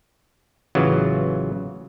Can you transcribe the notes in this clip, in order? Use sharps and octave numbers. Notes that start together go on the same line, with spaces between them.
A1 C#3 E3 F#3 F4